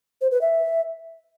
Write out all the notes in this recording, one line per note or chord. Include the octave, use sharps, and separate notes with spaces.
C5
B4
E5